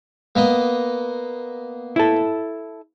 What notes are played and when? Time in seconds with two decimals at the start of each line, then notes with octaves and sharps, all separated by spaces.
0.35 A#3 B3 D#5
1.96 E4 A4